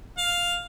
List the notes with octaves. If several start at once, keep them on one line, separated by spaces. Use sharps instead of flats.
F5